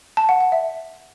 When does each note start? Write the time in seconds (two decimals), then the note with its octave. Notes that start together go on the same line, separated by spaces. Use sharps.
0.17 A5
0.29 F#5
0.41 F#5
0.52 E5